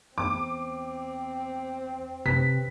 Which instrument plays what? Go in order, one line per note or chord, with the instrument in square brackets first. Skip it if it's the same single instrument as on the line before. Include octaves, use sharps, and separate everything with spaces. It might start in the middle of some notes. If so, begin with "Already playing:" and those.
[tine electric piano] E2 [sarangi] C4 [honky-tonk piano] D6
[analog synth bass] C3 [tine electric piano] B4 [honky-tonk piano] B6